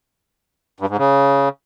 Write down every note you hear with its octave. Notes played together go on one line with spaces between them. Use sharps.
G2
G#2
C#3